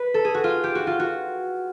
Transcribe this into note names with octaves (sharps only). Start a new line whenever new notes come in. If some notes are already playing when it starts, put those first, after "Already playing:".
Already playing: B4
A4
G#4
F#4
F4
G4
F#4
F4
F#4